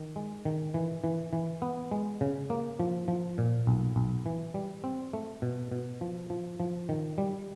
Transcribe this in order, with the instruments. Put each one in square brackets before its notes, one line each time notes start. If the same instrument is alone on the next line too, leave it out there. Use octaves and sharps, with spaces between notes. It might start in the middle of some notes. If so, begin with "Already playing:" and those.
Already playing: [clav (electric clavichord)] D#3
G#3
D#3
E3
E3
E3
B3
G#3
C#3
A#3
F3
F3
A#2
B1
B1
E3
G3
C4
A3
B2
B2
F3
F3
F3
D#3
G3